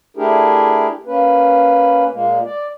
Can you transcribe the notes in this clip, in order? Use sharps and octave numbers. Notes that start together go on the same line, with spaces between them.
A3 D4 E4 G4 G#4 A#4
A#3 C#4 B4
A#2 G#3 A#3
D5